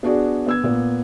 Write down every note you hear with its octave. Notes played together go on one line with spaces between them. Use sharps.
B3 D4 F#4 G#4
B3 E6 G#6
A#2 B3